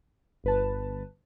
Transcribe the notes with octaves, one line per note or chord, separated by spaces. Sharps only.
G1 B4 A5